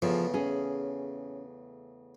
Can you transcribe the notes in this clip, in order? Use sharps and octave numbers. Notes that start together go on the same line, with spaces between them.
E2 A2 C#3 F3
C#4 G#4